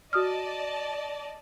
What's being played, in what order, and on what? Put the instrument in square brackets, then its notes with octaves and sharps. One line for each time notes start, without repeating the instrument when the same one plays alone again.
[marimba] F#4 D#6 F6 [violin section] D5 D#5 A5